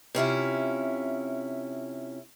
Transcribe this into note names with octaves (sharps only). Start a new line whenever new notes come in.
C3 C#4 E4 F4